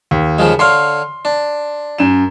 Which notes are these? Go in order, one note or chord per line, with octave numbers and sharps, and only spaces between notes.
D#2
C#3 F3 G#3
D3 C#5 F5 C6
D4
F#2 E7